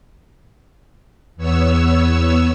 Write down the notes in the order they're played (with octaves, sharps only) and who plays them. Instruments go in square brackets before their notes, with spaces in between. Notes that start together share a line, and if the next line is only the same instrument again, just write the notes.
[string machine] E2 B3 C#5 E6